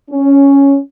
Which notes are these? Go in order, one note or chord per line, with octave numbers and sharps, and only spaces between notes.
C#4